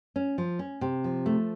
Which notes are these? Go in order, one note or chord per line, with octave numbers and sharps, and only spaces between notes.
C#4
F3
C#4
C3
F3
A3